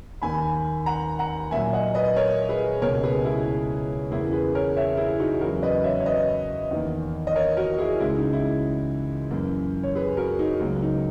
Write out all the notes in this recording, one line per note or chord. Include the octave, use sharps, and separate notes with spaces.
D#2 D#3 A#3 G#5 B5
F#5 A#5
F#5 A#5
A#2 F#3 A#3 E5 G#5
D#5 F#5
B4 D#5
A#4 C#5
G#4 B4
C#2 B2 A#3 A#4 C#5
G#4 B4
E4 G#4
E2 C#3 E3 A#3 E4 G#4
G#4 B4
A#4 C#5
C#5 E5
E4 G#4
D#4 F#4
E2 C#3 F#3 F#4 A#4
B4 D#5
C#5 E5
C#5
B4 D#5
E2 D#3 A#3
D#5
A#4 C#5
F#4 A#4
E4 G#4
C#2 C#3 G#3 E4
D#4
E4
F#2 E3 A#3
C#5
G#4 B4
F#4 A#4
D#4 F#4
C#2 C#3 F#3 A#3
D#4